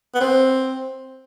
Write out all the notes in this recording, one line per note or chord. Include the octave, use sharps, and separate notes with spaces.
B3
C4